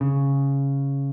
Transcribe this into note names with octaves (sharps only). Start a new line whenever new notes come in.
C#3